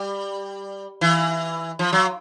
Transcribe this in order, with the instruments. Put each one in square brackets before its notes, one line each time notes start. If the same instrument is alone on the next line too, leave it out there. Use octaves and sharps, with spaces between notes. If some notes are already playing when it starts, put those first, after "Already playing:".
Already playing: [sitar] G3
E3
F3
F#3